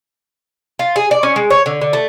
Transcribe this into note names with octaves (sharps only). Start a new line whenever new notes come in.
F4
G#4
D5
C#4
G#3
C#5
D3
D3
A3